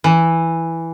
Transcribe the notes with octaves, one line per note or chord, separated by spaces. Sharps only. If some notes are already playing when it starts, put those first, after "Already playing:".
E3